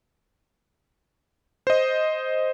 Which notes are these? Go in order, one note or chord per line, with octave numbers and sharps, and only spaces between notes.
C5 D#5